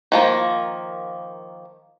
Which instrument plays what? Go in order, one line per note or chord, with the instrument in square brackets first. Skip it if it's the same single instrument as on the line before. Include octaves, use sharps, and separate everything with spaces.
[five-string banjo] D#3 F3 A#3